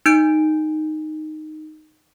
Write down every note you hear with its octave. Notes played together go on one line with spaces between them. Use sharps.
D#4 G6 D7